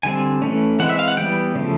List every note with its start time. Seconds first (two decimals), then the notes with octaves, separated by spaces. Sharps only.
0.03 D3 G3 C4 G#5
0.42 E3 A3 C#4
0.79 E3 G#3 C4 F#5
0.89 E5
0.99 F5
1.08 F#5
1.17 E3 G3 B3 G5
1.55 C#3 F3 A3